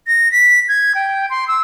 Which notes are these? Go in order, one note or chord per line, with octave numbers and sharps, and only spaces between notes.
A#6
B6
G#6
G5
C6
E6